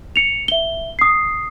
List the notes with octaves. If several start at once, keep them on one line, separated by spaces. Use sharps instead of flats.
C#7 F7
E5 G7
D#6 C7